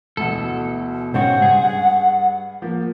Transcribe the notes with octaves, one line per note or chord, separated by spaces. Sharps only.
D2 B2 E3 A4
G#2 C#3 F#4 C5 C#5 F#5 G5
G2 G#4
F3 A#3